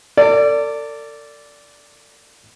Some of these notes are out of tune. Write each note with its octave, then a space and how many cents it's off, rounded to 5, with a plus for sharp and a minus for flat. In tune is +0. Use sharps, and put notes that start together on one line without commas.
A4 +45 D5 -10